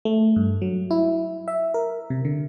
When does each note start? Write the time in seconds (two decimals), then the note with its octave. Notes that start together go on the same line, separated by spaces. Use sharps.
0.05 A3
0.36 G2
0.62 F#3
0.91 E4
1.48 E5
1.74 A#4
2.10 C3
2.25 D3